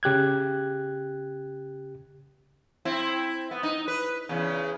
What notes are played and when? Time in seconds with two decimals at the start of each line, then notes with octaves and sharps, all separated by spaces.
0.03 C#3 G4 F#6 G#6
2.85 C4 E4
3.51 B3
3.63 D#4
3.88 B4
4.29 E2 C#3